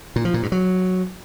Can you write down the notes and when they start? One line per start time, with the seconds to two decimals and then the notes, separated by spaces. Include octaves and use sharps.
0.16 A#2
0.25 F3
0.34 A#2
0.43 G2
0.52 F#3